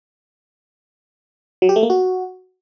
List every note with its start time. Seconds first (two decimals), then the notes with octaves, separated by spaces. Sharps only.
1.62 F#3
1.69 G4
1.76 A3
1.83 A#3
1.90 F#4